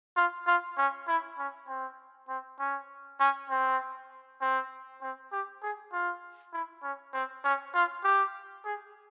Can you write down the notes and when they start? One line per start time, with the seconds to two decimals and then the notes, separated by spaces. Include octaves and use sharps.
0.17 F4
0.47 F4
0.77 C#4
1.08 E4
1.38 C#4
1.68 C4
2.29 C4
2.59 C#4
3.20 C#4
3.50 C4
4.41 C4
5.02 C4
5.32 G4
5.62 G#4
5.93 F4
6.53 E4
6.83 C#4
7.14 C4
7.44 C#4
7.74 F4
8.04 G4
8.65 G#4